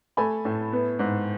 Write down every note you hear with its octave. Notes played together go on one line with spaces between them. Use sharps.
A3 G#5 B5
A2
B3
G#2